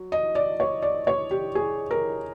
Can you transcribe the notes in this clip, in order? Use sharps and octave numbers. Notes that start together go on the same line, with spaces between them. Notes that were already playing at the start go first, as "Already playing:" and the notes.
Already playing: F#3
D#5
D5
C#5
D5
C#5
G4
G#4
A#4